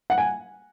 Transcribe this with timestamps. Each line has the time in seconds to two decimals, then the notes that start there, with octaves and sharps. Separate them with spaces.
0.10 F#5
0.18 G#5